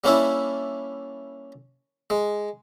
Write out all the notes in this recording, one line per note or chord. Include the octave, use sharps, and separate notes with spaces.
G3 A#3 C#4 D4 E4
G#3